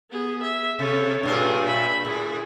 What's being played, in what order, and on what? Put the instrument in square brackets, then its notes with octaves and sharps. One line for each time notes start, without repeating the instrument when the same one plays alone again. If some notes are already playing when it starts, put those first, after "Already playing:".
[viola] B3 G#4
E5
[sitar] C3 [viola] A4 C#5
[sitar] G2 A#2 G#4 [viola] D4
[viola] E5 B5
[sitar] A2 [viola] G#4